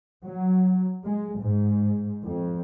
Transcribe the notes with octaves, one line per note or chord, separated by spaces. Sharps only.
F#3
G#3
G#2
F2